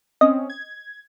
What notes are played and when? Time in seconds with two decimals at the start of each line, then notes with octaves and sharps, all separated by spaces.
0.21 C4 C#4 D#5
0.50 G#6